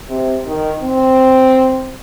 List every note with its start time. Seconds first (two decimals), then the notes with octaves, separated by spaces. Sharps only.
0.09 C3
0.45 D#3
0.81 C4